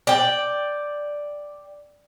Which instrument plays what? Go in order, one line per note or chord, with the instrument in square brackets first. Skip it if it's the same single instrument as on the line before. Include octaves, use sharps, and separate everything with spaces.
[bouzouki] D5 G5